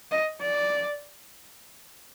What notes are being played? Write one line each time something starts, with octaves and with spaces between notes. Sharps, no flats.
D#5
D5